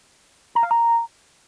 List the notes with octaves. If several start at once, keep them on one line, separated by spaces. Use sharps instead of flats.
A#5
F5
A#5